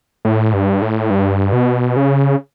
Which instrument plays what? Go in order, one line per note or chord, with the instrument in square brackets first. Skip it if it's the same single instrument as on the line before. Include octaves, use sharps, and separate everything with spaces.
[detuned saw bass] A2
G2
A2
G2
B2
C#3